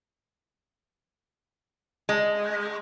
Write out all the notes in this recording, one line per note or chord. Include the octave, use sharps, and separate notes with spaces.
G#3